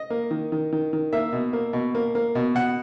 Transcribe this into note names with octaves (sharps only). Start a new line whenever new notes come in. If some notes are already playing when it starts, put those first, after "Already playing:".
Already playing: D#5
A#3
D#3
D#3
D#3
D#3
A#3 E5
B2
A#3
B2
A#3
A#3
B2
B2 F#5